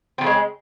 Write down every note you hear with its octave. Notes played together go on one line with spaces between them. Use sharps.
C#3 F3 G#3 C4